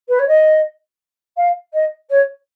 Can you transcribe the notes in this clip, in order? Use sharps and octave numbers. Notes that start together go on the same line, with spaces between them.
B4
C#5
D#5
F5
D#5
C#5